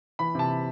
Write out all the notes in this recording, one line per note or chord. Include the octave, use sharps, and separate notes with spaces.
E3 B5
C3 A5